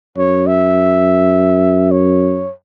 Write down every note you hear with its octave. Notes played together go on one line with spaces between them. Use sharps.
F#2 C#5
E5
C#5